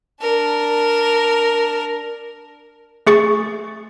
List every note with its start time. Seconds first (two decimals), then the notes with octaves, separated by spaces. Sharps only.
0.21 D4 A#4
3.07 A3 G#4 C#6 A6